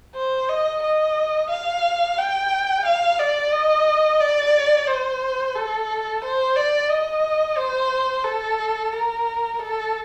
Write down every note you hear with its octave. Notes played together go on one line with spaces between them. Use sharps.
C5
D#5
D#5
F5
G5
F5
D5
D#5
D5
C5
A4
C5
D5
D#5
C5
A4
A#4
A4